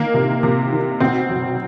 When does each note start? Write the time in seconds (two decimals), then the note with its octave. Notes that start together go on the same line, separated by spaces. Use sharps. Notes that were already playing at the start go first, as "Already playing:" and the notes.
Already playing: D#3 A#3
0.14 C3
0.43 C3
0.71 D#3
1.00 B2 C4
1.29 F#1